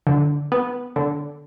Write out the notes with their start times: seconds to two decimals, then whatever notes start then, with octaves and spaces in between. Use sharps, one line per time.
0.07 D3
0.52 B3
0.96 D3